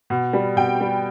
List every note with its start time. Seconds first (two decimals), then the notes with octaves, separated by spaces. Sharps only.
0.10 B2
0.33 G3
0.57 B2 G5
0.81 G3